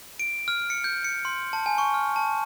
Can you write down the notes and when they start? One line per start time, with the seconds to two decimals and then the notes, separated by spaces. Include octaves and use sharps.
0.20 D7
0.48 F6
0.70 C#7
0.84 G6
1.04 C#7
1.25 C6
1.53 A5
1.66 G#5
1.78 C#6
1.94 F6
2.16 A5